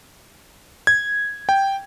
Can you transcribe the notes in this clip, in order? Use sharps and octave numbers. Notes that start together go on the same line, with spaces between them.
G#6
G5